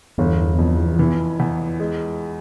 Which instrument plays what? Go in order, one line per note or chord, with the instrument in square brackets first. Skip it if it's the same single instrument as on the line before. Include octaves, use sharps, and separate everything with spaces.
[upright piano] G1 [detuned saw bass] E2
[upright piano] F2
E3
E2
G#3